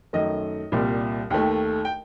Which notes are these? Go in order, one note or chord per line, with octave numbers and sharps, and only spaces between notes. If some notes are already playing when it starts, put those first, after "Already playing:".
F#2 D#3 A3 D#5
C2 A#2 G3
D#2 D#3 A3
G5